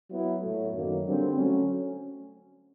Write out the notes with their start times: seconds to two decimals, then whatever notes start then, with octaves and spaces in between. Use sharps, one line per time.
0.10 F#3 B3 E4
0.42 A2 F#3 A3
0.74 F#2 D#3 F#3 A#3
1.06 D3 G3 C4
1.36 F#3 A3 C#4